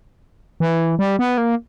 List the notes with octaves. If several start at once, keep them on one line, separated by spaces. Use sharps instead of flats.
E3
G3
B3
A#3